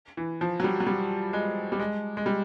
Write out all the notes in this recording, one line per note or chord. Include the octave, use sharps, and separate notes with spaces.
E3
F3
F#3
G3
F#3
G3
G#3
G3
G#3
G#3
G3